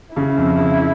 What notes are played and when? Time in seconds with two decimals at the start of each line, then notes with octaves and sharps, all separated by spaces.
0.16 C#3 E4
0.38 F2
0.59 C#3